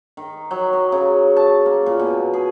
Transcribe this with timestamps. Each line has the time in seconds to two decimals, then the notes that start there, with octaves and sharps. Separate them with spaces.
0.17 D#3
0.51 F#3
0.73 D#5
0.92 C#3
1.36 A5
1.66 A#3
1.86 A#2
1.99 B2
2.33 G#4